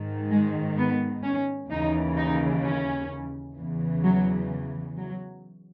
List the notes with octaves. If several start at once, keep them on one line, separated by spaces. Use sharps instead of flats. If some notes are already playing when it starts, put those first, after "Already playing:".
Already playing: G#2 D#3
G#3
B3
C#4
D#2 C#3 E3 D#4
D#4
C#4
E2 C#3 E3
F#3
F#3